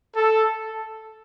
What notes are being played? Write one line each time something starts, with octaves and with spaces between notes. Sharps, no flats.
A4